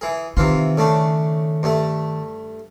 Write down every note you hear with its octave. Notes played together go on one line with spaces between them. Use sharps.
E3 G#4
C3 D#3 E3 F4
C#3 A3 D4
G2 A3